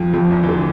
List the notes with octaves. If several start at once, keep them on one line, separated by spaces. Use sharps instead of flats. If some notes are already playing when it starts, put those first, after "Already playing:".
Already playing: F2 F3
F2 F3
E2 E3
E3
D3